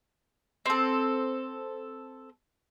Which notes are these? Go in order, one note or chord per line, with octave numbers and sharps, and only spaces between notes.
C4 A4